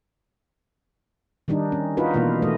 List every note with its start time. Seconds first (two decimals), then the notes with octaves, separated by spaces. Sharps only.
1.48 D#3 G3 D4 D#4
1.72 C#4
1.97 D#4 F4 F#4 A#4 B4
2.14 B2 E3 A#3 F4
2.42 E3 A3 D#5